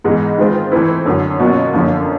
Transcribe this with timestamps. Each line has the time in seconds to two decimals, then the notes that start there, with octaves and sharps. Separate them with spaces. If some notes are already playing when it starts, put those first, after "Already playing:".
0.04 G#2 E3 G#3 B3 D#4
0.38 D#3 G#3 C4 F4
0.72 E3 A3 C4 E4
1.06 F#2 D3 F#3
1.39 B2 F#3 A#3 C#4 F4
1.74 F#2 D3 F3 A#3